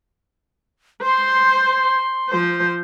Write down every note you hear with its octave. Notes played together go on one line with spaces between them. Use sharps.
C5 C6
F3 C5